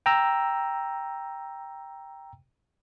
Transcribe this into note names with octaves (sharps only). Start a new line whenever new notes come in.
G5 A#5 E6